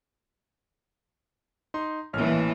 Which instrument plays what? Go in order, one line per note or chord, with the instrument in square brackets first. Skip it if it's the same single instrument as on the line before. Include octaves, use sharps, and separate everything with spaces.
[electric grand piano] D#4 C6
[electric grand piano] A1 C#5 F6 [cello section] A#2 E3